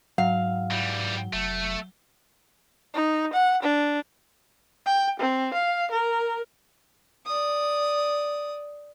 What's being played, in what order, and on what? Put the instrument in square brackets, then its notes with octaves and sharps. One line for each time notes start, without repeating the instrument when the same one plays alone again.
[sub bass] G#2 [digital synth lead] F#3 [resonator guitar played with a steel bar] F5
[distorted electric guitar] E3 G3
[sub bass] F1 [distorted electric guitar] A3
[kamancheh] D#4
F#5
D4
G5
C4
F5
A#4
[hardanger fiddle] D5 D#6